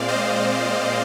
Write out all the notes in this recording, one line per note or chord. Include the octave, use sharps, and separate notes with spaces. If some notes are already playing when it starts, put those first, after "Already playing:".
Already playing: A#2 G#3 C4 D5 F5
C5 D#5